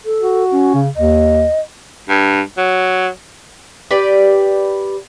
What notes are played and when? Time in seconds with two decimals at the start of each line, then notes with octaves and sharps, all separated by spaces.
0.05 A4
0.21 F#4
0.51 C#4
0.74 C#3
0.96 D#2 D#5
2.09 G2
2.57 F#3
3.91 G4 B4 D5